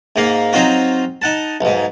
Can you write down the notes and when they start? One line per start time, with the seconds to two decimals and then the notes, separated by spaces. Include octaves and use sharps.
0.16 G#2 A#3
0.53 F#3 C4 D#4 F4 F#4
1.22 D#4 F#5 A5
1.61 B1 G#2